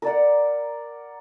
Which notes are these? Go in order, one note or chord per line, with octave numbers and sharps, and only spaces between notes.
A#4 D5 F#5